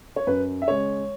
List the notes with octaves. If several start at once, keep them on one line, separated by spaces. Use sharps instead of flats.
C#5
F#2 B4
E5
C#3 G#3 C#5